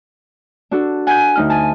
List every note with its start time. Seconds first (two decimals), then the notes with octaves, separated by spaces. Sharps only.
0.71 D4 F#4 A4
1.07 F#5 G#5 G6
1.35 D2 D#4 F6
1.50 G#5 A5